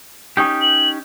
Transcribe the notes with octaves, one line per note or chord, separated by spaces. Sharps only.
C#4 D#4 G4
F#7